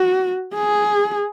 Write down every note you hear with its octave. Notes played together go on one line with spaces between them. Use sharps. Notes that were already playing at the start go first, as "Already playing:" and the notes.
Already playing: F#4
G#4